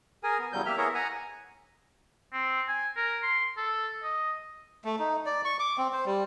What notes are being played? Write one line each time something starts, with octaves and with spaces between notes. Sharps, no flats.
G#4 A#4 G#5
B3
E2 C#3 F#3 G3 G6
A#3 G4 E5 F6
B3 E4 G#4 A#4 C#5 E5
F#5 G#5 A#5
C4
G#5
A#4
C6
A4
D#5
A3
D#4
D5
C#6
D6
C4
C5
G3